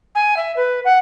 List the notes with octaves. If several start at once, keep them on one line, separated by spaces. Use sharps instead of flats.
G#5
E5
B4
F#5